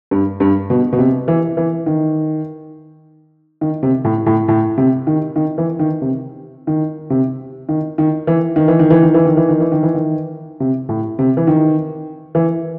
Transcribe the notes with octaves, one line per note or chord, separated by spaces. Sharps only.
G2
G2
B2
B2
C3
E3
E3
D#3
D#3
C3
A2
A2
A2
C3
D#3
D#3
E3
D#3
C3
D#3
C3
D#3
D#3
E3
D#3
E3
D#3
E3
D#3
E3
D#3
E3
D#3
E3
D#3
E3
D#3
C3
A2
C3
E3
D#3
E3